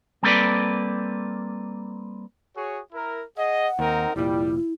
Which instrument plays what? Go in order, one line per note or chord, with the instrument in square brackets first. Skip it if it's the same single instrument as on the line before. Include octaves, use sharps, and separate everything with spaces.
[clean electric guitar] G3 A#3 C4 A4 B4 D5
[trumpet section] F#4 G#4 C#5
E4 A#4
[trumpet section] G#4 D#5 [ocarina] F#5
[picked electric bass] D#2 [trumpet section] C4 D#4 A#4
[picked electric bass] F1 A#2 [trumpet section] G3 [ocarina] E4